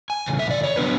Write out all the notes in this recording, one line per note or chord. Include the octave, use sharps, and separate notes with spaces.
G#5
E2 C#3
E5
D5
C#5
F#3 B3 D4 B4